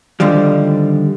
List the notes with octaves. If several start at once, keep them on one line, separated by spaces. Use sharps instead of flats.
D3 D#3 F3 G3